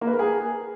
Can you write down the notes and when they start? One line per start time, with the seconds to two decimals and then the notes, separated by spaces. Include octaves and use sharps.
0.01 A#3
0.07 B4
0.13 A#4
0.19 G#4